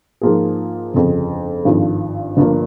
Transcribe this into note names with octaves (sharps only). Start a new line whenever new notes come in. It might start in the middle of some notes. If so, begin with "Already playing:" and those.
G#2 F3 A#3 F4 G#4
G1 F2 C#3
G#1 G2 F3
G1 G2 F3 A#3